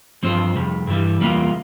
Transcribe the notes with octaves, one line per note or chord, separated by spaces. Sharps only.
G2 F3 C4 F4 C5
F2 C3 G3
G2 E3 G3
E2 C3 G3 A#3 F4